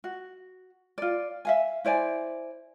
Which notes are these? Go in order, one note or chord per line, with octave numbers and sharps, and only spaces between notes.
F#4
F4 D5
E5 F5 G#5
E4 C5 D5 G#5